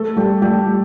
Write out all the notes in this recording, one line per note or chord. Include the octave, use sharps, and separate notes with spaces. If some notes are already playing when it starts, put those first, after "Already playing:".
Already playing: A3 A4
G3 G4
G3 G4